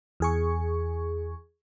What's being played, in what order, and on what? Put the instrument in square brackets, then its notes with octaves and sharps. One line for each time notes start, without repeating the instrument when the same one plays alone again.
[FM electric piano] E2 G#4 C#6